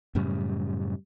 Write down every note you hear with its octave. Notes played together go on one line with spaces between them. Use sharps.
F#2 A2 C#3 G3